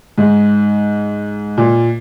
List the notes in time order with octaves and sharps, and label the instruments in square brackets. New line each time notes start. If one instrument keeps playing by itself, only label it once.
[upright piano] G#2
A#2